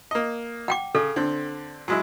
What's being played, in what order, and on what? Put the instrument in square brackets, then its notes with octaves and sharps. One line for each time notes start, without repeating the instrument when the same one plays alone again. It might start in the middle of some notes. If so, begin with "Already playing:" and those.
[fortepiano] A#3 D#5
[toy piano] F#5 G5 D6
[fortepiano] C#3 [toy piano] A4
[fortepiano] D3 C4
F#3 G#3 E4